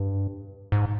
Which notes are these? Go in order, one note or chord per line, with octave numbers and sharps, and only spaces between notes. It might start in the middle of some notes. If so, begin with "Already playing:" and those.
Already playing: G2
G#2